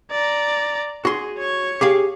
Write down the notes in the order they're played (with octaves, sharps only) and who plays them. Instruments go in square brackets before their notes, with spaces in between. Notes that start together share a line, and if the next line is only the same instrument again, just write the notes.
[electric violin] D5 A#5
[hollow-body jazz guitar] F#4 C6 [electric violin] G#4
[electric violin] C#5 C#6
[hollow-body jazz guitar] G4 G#4 F5